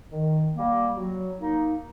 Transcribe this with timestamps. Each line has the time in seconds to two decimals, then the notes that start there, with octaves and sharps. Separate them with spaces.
0.12 D#3
0.54 G3 A#3
0.96 F#3
1.39 A#3 D#4